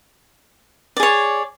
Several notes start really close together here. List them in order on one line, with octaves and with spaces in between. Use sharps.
D5 G#4 C#5